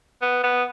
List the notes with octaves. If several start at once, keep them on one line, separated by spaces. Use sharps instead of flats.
B3
B3